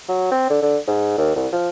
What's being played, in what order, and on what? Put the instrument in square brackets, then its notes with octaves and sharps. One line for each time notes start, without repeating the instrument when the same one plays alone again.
[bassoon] F#3
C4
D3
D3
G#2
D#2
C2
F3